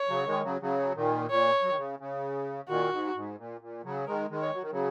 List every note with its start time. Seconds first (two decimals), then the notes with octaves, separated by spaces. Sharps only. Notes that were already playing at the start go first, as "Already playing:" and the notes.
Already playing: C#5
0.09 C#3 F#3
0.26 D#3 G#3
0.44 C#3 F#3
0.61 C#3 F#3
0.95 A#2 D#3
1.30 A#2 C#5
1.62 F#3
1.69 D#3
1.77 C#3
1.99 C#3
2.69 A#2 D#3 F#4
2.92 G#2
3.15 G#2
3.38 A#2
3.61 A#2
3.84 C#3 F#3
4.07 D#3 G#3 A#4
4.30 D#3 G#3
4.42 C#5
4.54 F#3
4.62 D#3
4.71 C#3 F#3